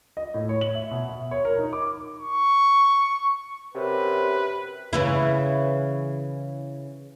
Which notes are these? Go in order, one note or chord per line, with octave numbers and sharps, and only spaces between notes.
D#5
A2
C#5
F#7
E5
B2
E5
C#5
A#4
D#4
D6
C#6
F#2 C3 B4
C#3 E3 E4